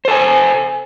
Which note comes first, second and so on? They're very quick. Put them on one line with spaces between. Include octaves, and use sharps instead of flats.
C5 A4 G#5